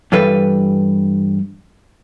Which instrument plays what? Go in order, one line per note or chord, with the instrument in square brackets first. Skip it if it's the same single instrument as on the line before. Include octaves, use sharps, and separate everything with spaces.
[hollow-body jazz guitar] G2 E3 G3 A4 B4 F5